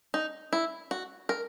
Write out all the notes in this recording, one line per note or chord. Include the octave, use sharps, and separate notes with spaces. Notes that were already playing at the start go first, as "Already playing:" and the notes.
D#4
E4
F#4
A#4